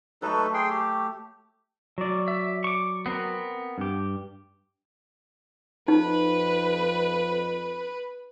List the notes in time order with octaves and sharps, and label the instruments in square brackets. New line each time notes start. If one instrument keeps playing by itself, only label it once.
[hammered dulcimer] F#3 A3 [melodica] D#4 A4 B4
[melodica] G#4 G5 C6
G4
[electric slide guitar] F#3 D5
[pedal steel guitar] E5
C#6 D6
B3 C4 A#4
[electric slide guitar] G2 G4
[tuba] F2 [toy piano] D#4 [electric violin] B4